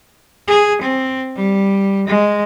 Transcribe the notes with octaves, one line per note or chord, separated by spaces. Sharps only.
G#4
C4
G3
G#3